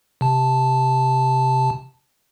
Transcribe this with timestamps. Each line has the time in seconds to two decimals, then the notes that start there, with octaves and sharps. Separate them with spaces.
0.21 C3 A5